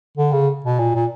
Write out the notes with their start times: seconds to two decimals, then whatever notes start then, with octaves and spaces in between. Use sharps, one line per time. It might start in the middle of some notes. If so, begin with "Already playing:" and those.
0.18 D3
0.33 C#3
0.65 B2
0.79 A#2
0.95 A#2